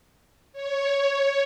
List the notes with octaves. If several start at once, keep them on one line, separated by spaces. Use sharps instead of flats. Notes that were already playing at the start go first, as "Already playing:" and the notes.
C#5